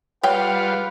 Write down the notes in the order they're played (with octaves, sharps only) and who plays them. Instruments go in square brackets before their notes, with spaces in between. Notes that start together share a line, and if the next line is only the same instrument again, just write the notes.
[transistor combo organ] G3 F4 [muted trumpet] B4 [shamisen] C#5 G5 [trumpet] F#5